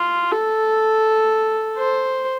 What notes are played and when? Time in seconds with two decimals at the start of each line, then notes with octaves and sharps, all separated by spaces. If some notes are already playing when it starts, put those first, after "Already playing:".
Already playing: F4
0.32 A4
1.77 C5